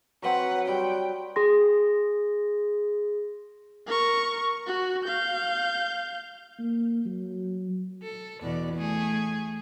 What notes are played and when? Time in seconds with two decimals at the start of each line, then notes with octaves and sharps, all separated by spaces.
0.22 F#3 C4 B4 F#5
0.67 G3 F#5 G5
1.36 G#4 C6 A#6
3.87 A#4 C#6
4.67 F#4
5.05 F5 G6
6.59 A#3
7.06 F#3
8.03 A4
8.42 E2 B2 D5
8.75 A3 G#4